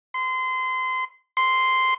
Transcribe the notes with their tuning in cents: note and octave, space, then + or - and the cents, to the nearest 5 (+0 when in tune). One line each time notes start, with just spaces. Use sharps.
C6 -25
C6 -5